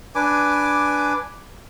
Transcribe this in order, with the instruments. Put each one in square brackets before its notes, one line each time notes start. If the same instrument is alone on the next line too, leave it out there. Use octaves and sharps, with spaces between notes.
[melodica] D4 B4 G#5 D6